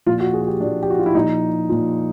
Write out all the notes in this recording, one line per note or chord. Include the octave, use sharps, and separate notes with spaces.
A#2 F3 F4
F#4
G#4
F#4
G4
A#2 F3 D4
G4
F#4
F4
E4
A#2 F3 D#4
A#2 F3